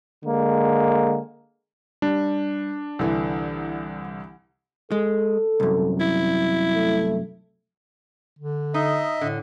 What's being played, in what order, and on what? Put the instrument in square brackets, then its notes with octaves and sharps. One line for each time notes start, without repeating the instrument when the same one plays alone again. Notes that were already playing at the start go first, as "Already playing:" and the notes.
[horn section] D3 G#3 A#3
[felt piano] G3 [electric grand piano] D4
[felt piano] C2 D3 E3
[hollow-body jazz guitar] G#3 [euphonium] A4
[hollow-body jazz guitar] C2 F#2
[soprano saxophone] E4
[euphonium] A3
[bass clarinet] D3
[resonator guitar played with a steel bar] D#4 [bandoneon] D#5 E5
[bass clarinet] A2 [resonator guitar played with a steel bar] D3